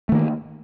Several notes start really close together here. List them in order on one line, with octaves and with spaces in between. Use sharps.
A3 D#3 A#3